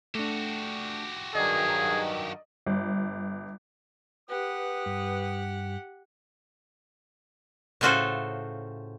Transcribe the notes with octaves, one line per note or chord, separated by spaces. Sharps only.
A3 D4 F#4 G4
G2 D#3 F#3 G#4 D5 D#5
G1
G4 B4 F#5 D#6
G2
A2 C#3 F4 F#4 A4 C5